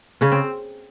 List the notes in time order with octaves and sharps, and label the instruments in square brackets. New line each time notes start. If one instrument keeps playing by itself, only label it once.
[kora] C#3 C#4
C4